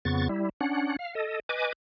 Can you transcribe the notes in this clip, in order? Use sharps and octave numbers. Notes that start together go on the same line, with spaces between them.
F2 C#3 B3 C#6 A6
G3 E4
C#4 D4 F#5
F5
A4 D#5
B4 D#5 G#5 D6